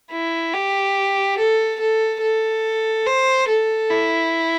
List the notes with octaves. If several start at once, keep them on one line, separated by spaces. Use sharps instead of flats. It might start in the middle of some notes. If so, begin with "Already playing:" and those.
E4
G4
A4
A4
A4
C5
A4
E4